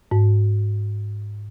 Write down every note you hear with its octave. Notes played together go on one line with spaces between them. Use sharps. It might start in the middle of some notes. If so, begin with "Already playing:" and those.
G#2